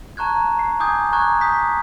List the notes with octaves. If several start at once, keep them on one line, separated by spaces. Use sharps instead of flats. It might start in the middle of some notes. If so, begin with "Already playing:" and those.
A5 A#5 C#6 F#6 G#6
C7
G#5 D6 D#6 G6 G#6
A#5 C#6 D6 F#6 G#6
D#6 G6 B6